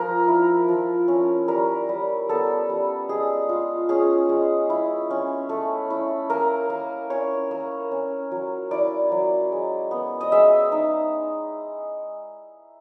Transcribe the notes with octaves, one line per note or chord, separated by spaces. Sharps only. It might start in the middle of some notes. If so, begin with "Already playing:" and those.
Already playing: F3 A#4
E4
F3
C#4
G3 A#4
G3
B3 A4
G3
G#3 G#4
F4
C#4 G#4
G#3
E4
C#4
A3
E4
A#3 A#4
A#3
C#4 C#5
A#3
C#4
F#3
E4 D5
F#3
G#3
B3
D#5
G#3 E5
D#4